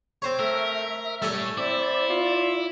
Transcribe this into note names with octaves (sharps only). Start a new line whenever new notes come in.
C4 C5 C#5
A3 A#4 E5
G3 A3 A4 C#5 G#5 A5
C4 E4 D5
F4